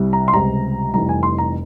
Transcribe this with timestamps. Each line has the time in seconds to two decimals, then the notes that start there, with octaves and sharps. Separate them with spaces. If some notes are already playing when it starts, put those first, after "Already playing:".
Already playing: C2 C3 G3
0.13 A#5
0.28 C6
0.33 C#2 C3 G3 C4 A#5
0.94 F1 F2 E3 G3 A#5
1.09 G#5
1.23 C6
1.38 A#5